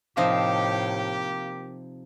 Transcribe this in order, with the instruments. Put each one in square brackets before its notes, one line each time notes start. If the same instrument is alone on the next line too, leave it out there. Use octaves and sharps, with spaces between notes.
[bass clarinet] A2 [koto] C3 F3 D#4 [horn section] A#3 G4 [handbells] F5